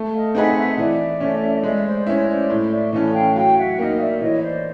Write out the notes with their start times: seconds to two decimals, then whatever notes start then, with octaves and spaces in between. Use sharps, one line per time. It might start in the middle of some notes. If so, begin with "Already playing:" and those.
Already playing: A3
0.13 D#5 F5
0.35 C4 D#4 G#4 B4 E5 F#5
0.56 E5 F#5
0.78 E3 D5 E5
1.20 A3 C#4
1.63 G#3 D5 E5
1.85 C5 D5
2.07 C#4 E4 B4 C#5
2.28 C5 D5
2.50 A2
2.71 D5 E5
2.93 E3 A3 C#4 D#5 F5
3.14 F5 G5
3.35 F#3 F5 G5
3.57 E5 F#5
3.78 A#3 D#4 D#5 F5
4.00 D5 E5
4.21 E3 C#5 D#5
4.42 C5 D5